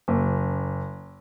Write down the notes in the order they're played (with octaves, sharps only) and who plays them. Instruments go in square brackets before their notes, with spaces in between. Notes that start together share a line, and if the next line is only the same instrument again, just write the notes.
[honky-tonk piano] F#1